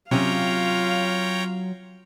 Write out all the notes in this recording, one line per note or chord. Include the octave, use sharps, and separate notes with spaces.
C3 F#3 C#4 F4 C#5 F5 G5 A#5